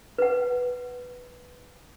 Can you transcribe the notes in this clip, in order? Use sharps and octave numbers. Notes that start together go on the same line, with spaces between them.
B4 F#5